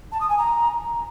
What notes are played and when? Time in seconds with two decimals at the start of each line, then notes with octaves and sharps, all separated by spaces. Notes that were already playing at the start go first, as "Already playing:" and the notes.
0.12 A5
0.21 D#6
0.29 G#5
0.38 A#5